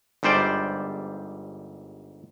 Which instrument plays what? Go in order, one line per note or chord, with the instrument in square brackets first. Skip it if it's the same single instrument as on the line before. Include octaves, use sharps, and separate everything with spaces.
[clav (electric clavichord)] G1 G#2 G3 C5 D5 G5